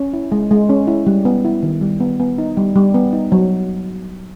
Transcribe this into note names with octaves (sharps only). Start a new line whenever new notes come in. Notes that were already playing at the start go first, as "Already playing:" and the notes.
Already playing: C#4
E4
G#3
G#3
C#4
E4
G3
B3
E4
D#3
G3
B3
B3
D#4
G3
G3
B3
D#4
F#3